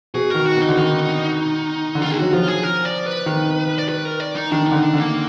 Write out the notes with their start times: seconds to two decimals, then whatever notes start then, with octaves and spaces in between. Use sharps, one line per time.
0.14 B2 G#4
0.30 D#3 A#4
0.46 F#4
0.56 B2 D#4
0.69 D3
0.77 D#3
1.95 D3
2.01 D#3 F4
2.11 G#4
2.18 F#3 F#4
2.33 F3 F4
2.48 G#4
2.63 A#4
2.85 D5
3.06 B4
3.26 D#3
3.78 D5
3.89 B4
4.05 A#4
4.20 D5
4.36 D#4
4.51 D#3 D4
4.67 D3 D#4
4.83 D4
4.93 D3 A#3